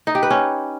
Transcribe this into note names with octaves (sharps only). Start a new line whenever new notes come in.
D#4
G4
B4
C#4